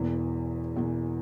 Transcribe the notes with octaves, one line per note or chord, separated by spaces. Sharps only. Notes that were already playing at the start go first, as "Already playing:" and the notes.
Already playing: E1 E2 E3
E1 E2 E3